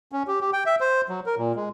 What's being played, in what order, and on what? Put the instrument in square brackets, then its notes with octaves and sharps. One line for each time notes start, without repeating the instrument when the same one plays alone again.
[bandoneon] C#4
G4
G4
G5
E5
C5
F#3
A#4
A#2
G#3